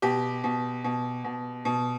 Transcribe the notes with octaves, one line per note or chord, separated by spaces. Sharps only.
B2 G4
B2
B2
B2
B2